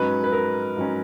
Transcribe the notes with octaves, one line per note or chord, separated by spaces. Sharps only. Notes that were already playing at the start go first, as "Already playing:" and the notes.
Already playing: G#2 F#3 C#4 B4
B4
A#4
G#2 F#3 C#4